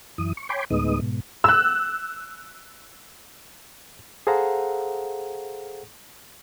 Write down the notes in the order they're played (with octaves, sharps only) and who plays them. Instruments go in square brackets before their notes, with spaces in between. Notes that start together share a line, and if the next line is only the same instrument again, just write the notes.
[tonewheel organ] F#2 E3 D#6
C#6
C#5 G5 G#5 B5 C6 D6
D2 A2 G#3 B3 D#4 D#6
G#2 B2
[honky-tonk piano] E6 F#6
[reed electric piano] G#4 A4 C5 F5 F#5 A#5